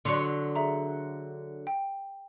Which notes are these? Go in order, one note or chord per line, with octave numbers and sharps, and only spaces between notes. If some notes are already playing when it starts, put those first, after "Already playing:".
D3 F#3 C6 C#6
G#4 E5 A#5
G5